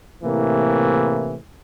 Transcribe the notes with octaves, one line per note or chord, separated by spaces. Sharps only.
A2 C3 E3 A#3